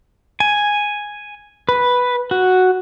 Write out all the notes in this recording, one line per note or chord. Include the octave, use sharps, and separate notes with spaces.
G#5
B4
F#4